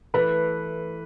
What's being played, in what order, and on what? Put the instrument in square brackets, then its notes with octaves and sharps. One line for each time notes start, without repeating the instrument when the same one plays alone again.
[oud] E3 A3 [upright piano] B4